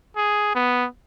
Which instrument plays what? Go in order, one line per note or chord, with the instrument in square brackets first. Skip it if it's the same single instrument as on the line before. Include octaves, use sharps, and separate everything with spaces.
[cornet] G#4
B3